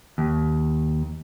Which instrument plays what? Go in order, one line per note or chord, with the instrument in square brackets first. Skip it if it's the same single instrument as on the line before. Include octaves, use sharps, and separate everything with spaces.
[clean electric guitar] D#2